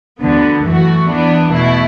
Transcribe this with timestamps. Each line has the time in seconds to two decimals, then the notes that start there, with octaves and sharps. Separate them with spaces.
0.21 D2 D3 B3
0.65 F#2 E3 A3 F#4
1.08 E2 E3 B3 D4
1.52 B2 A3 E4